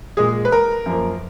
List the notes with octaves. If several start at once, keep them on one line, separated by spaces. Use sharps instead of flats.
A#2 G#3 G#4
B4
A#4
F#2 F3 A#3